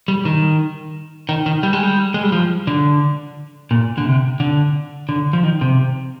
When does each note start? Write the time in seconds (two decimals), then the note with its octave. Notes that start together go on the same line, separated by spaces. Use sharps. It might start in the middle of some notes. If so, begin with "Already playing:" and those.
0.08 G3
0.25 D#3
1.29 D#3
1.46 D#3
1.63 G3
1.73 G#3
1.83 G3
2.14 G#3
2.23 G3
2.32 F3
2.67 D3
3.71 A#2
3.98 D3
4.05 C3
4.40 D3
5.09 D3
5.33 F3
5.43 D#3
5.61 C3